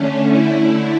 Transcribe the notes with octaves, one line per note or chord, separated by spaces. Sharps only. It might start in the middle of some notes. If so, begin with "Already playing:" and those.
Already playing: D3 A3 C#4
D3 A3 E4